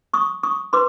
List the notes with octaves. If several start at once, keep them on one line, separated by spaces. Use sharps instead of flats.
C#6 D#6
C#6 D#6
B4 C6 D6